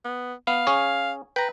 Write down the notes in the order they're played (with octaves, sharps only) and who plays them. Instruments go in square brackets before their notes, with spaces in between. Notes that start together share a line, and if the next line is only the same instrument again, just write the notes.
[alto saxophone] B3
[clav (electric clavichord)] B3 [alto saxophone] F5
[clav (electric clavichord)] C#4 G#4 C#5
[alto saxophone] B4 [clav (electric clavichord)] G5 A#5